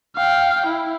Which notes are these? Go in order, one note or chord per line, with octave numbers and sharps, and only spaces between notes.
F5 G5
E4